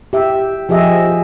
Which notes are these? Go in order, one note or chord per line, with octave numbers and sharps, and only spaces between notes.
G4 E5
F3 G4 G#4 D#5 E5
G#4